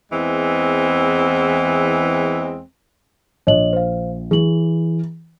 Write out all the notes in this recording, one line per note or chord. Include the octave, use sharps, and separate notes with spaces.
E2 E3 G#3 C4
A#1 C#5 D#5 F#7
C5 F5
E3 G#4 F#7